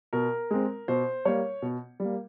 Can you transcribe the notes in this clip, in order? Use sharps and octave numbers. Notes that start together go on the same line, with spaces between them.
B2 A#4
G#3 C4
B2 C5
G3 A#3 C#5
B2
G3 A#3